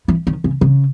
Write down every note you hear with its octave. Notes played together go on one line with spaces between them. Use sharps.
E3
D#3
C#3
C#3